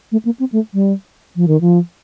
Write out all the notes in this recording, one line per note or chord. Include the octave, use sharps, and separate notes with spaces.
A3
A#3
C4
A3
G3
F3
D#3
F3